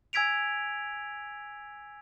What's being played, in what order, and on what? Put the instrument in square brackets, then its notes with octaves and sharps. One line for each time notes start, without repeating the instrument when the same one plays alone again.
[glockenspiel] G#5 E6 G#6 B6 D7 F7